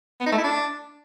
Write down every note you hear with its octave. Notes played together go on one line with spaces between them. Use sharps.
B3
D#4
A3
E4
D4